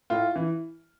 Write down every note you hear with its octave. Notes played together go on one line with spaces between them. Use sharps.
A2 F4
E3